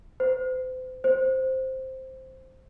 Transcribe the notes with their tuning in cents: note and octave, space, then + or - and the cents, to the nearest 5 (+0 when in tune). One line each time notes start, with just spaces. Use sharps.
C5 -35
C5 +5